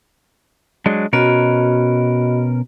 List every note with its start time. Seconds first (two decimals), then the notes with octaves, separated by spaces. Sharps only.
0.86 F#3 G#3 D4
1.13 B2 C#4 F#4 A#4 D#5 B5